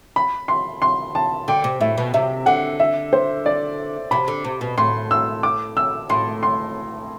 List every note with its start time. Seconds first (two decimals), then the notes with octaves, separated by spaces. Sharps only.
0.16 B5
0.48 C6
0.82 C6
1.15 A5
1.48 D3 G5
1.64 C3
1.81 A2 E5
1.98 B2
2.14 C3 E5
2.46 D3 F#5
2.80 E5
3.13 C5
3.46 D5
4.11 C3 B5
4.28 D3
4.44 C3
4.61 B2
4.78 A2 C6
5.11 E6
5.43 D6
5.77 E6
6.09 A2 C6
6.43 C6